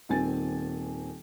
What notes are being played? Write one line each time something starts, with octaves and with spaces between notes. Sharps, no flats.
D#1 D#3 C4 G#5 A6